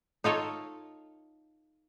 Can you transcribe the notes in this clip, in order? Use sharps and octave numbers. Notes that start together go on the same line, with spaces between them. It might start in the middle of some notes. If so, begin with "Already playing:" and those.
D#4 F4 A4 C#5